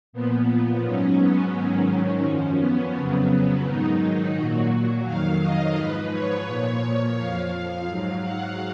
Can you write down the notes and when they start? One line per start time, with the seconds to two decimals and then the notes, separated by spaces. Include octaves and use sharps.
0.13 A#2 F3 B3
0.48 B3
0.83 G#2 F#3 C#4
1.18 B3
1.54 G#2 D#3 F#3 C#4
2.25 F#2 F3
2.60 B3
2.95 F2 C#3 F#3
3.30 B3
3.65 G#2 D#3 F#3 D#4
4.35 A#2 F#3 F#4
5.05 F2 D#3 F#3 F5
5.41 D#5
5.76 G#2 F3 B4
6.11 C#5
6.46 A#2 F3
7.17 F2 F3 F5
7.87 G#2 F#3 F5
8.23 F#5